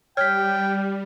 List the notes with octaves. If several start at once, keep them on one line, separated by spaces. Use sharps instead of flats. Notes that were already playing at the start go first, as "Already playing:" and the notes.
G3 C#5 G5 F6 G6 B6